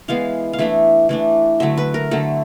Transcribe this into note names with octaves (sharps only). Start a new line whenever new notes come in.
E3 G#3 B3 F5
F5
E3 A3 D4 E5
E3 A3 D4
D3 F#3 A3 E5
B4
A#4
D3 F#3 A3 A4